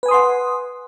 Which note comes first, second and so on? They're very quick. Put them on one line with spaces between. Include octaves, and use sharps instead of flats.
B4 G#5 D#6 C6 F#5